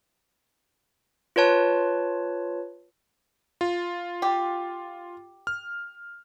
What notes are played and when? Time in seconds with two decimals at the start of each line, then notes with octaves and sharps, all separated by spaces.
1.36 F4 B4 C#5 A5
3.61 F4
4.22 G4
5.47 F6